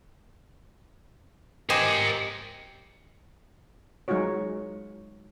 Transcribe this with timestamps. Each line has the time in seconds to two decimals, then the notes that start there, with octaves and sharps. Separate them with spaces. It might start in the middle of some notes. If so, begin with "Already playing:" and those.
1.70 G4 A#4 C5 D#5 G#5
4.08 F#3 G#3 D#4 F4 F#4 C#5